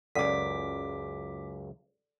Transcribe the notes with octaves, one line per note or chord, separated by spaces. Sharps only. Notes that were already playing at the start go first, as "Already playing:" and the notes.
C#2 F#2 A4 D5 F#5 D6 B6